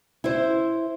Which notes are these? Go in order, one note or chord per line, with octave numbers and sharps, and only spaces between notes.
E4 C5